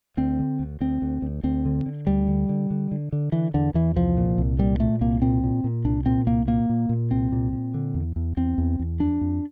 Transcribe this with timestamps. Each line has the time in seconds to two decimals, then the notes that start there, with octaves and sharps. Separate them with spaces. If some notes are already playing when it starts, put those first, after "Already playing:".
0.17 D2 C4
0.39 D3
0.59 D2
0.80 D2 C4
1.02 D2
1.22 D2
1.43 D2 C4
1.65 D3
1.86 D3
2.07 D2 G3
2.28 D3
2.49 D3
2.70 D3
2.91 D3
3.12 D3
3.32 D3 E3
3.54 E2 D3
3.74 E2 E3
3.96 C2 F3
4.17 A#2
4.38 C2
4.59 A#2 G3
4.79 A#2 A3
5.01 C2 A#3
5.22 A#2 C4
5.43 A#2
5.64 A#2
5.85 C2 D4
6.06 A#2 C4
6.27 C2 A#3
6.47 A#2 A#3
6.69 A#2
6.89 A#2
7.11 C2 C4
7.32 A#2
7.53 A#2
7.74 D3
7.94 E2
8.16 E2
8.37 E2 C4
8.58 E2
8.79 E2
8.99 F2 D4
9.21 F2